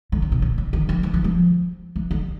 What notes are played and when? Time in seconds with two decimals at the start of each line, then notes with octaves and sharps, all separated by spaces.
0.12 D3
0.22 C#3
0.32 B2
0.42 A#2
0.58 C#3
0.73 D#3
0.89 E3
1.03 F3
1.14 E3
1.24 F3
1.96 E3
2.11 D3